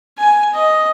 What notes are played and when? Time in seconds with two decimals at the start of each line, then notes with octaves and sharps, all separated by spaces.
0.18 G#5
0.53 D#5